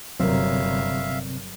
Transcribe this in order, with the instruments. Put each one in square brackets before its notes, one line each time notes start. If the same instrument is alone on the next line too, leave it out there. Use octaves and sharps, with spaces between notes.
[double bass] G1 [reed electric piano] C3 C4 [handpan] F#3 A#4 [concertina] E5 F5